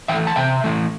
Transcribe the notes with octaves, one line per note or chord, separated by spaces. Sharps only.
E3 A3 E5 G5
A5
C3 E5 G5
E3 A3